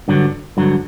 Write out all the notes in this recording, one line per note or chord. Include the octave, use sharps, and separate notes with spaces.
G2 D3 F#3
G2 D3 F#3